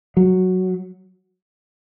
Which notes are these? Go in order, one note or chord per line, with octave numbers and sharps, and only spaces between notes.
F#3